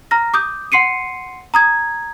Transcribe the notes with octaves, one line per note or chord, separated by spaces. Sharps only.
A#5 F6 A#6
D6 D#6 G6
F#5 C6 C7 C#7 D#7
A#5 D#6 G#6